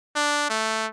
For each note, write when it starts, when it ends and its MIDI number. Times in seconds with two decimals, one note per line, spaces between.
0.16 0.46 62
0.50 0.87 57